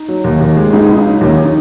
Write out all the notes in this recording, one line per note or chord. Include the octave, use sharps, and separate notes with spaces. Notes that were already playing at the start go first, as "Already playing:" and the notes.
Already playing: D#4
F#3
D#2
D#2
G#3
C#2 D#4 G#4
C#2
D#4
F#3
D#2 C#4
D#4